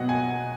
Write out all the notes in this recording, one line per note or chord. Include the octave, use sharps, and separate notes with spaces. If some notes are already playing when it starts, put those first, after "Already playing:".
Already playing: B2 F#3 B3 D#5 F#5
G#5